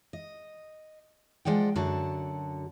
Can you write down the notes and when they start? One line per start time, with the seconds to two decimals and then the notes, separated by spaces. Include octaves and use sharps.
0.13 D#5
1.45 F3 G#3 D5 F#5 G5
1.76 F#2 D3 F#4 A5